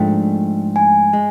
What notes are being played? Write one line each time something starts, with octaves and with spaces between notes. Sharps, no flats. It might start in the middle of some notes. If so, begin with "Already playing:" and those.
Already playing: G#2 F3 A3 D4 G5
G#5
G#3